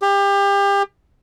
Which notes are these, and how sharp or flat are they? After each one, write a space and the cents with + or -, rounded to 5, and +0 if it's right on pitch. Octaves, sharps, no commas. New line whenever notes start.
G4 +30